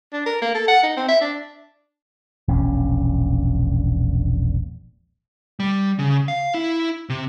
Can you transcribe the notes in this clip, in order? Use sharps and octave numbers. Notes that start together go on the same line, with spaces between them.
D4
A#4
A#3
A4
F#5
D#4
C4
E5
D4
E1 A#1 C#4
G3
C#3
F5
E4
C3